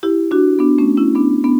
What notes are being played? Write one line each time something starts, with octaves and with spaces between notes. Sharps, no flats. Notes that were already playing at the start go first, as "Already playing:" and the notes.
E4 G4
D4 F#4
B3 D4
A3 C#4
C#4 E4
B3 D4
B3 D4